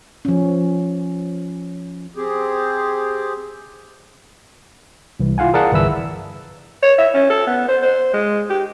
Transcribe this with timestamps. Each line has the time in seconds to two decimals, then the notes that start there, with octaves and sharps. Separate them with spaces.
0.25 F3 C#4
2.16 C4 G4 G#4
5.20 C2 E3
5.38 E4 F4 F5 F#5 G#5
5.54 G#4 A#4 D5 F5 F#5 A5
5.71 G1 C2 E3 B4 E5 E6
6.82 C#5
6.98 E5
7.14 C#4
7.30 A4
7.47 B3
7.68 C5
7.82 C5
8.13 G#3
8.49 G4